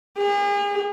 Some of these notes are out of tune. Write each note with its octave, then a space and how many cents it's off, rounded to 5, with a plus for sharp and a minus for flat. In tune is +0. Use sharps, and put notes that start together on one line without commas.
G#4 -40